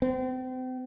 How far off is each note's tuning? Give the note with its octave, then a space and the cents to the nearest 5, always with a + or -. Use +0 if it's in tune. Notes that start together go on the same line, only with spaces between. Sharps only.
C4 -35